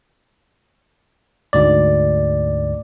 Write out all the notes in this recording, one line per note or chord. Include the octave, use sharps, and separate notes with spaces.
D2 G#2 D5